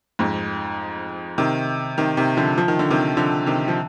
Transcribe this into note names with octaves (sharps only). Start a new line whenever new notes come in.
F2 G#2
C3 D#3
C3 D#3
C3 D#3
D3 F3
F3
D#3
D3
C3 D#3
D3 F3
C3 D#3
F3